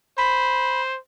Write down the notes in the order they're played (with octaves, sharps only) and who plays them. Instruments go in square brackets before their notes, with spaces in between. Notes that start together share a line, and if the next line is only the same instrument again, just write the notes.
[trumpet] C5 [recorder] B5